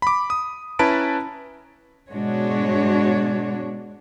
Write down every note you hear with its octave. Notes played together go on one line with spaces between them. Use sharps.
B5 D6
D#6
C#4 E4 B4 A5 A#5 D7
G#2 B2 G#3 D4 F#4 C#5